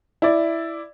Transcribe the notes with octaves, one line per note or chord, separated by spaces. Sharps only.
E4 D5